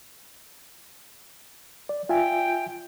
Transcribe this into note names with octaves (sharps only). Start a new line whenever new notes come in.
D5
F4 E5 G5 G#5